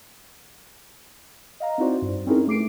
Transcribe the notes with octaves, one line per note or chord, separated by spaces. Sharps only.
D#5 F5 A#5
C4 D#4 E4 F#4 C5 D5
G2
C4 C#4 D#4 E4 G#4 A#4
A3 D6 C7 D7